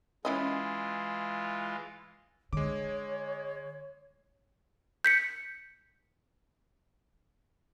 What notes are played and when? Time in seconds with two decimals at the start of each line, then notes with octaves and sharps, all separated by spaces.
0.25 E3 G#3 C#4 E4 F4 D#5
2.53 D3 G#3 C#5 D6
5.05 G6 B6 C#7